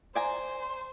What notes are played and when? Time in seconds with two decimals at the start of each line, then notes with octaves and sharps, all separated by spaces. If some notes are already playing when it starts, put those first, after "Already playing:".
0.15 C5 D5 G#5 A#5